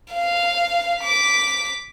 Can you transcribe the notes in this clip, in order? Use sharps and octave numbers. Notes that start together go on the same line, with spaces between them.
F5
D6 B6